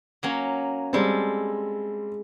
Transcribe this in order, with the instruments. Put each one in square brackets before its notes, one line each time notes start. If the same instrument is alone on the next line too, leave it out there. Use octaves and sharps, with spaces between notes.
[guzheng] F#3 A#3 C#4
[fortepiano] G3 C4 [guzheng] G#3 A4